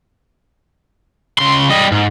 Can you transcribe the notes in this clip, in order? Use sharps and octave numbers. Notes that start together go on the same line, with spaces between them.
C#2 C6
G3 D#5
G#2